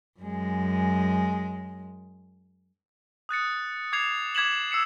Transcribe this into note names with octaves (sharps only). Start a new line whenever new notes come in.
F#2 G#3
D#6 F#6 A6 C#7
D6 G#6 C7 F7
D6 G#6 B6 E7 F#7
E6 C7 C#7 E7